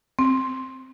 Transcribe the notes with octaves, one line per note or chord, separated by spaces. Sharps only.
C4